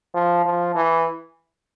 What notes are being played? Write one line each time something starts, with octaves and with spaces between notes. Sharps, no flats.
F3
F3
E3